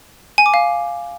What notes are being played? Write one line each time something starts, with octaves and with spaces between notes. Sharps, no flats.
G#5
D6
F5